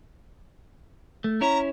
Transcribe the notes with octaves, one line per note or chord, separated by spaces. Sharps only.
A3
C#4 E4 C#5 A#5